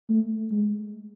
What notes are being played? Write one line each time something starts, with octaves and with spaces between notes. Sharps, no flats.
A3
G#3